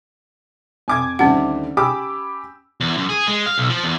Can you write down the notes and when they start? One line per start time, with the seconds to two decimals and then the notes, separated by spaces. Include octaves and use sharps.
0.88 F2 G#5 D6 G#6
1.19 D2 D3 D#3 G3 C4 C#4 F#5
1.77 G4 G5 G#5 B5 D6 E6
2.81 E2
2.97 F#2
3.09 G#4
3.28 G#3
3.46 F5
3.58 B1
3.69 F3
3.84 E2